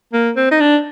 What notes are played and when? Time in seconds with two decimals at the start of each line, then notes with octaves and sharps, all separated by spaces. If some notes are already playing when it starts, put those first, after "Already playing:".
0.13 A#3
0.36 C4
0.51 D#4
0.60 D4